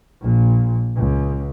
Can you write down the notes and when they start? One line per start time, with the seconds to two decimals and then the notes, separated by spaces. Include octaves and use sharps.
0.22 A#1 A#2
0.96 C#2